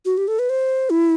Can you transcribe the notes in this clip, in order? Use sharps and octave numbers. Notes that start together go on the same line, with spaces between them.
F#4
G4
A4
B4
C5
E4